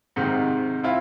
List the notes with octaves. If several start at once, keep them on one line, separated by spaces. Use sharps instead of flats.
G#2 C3 D#3
C4 E4 F4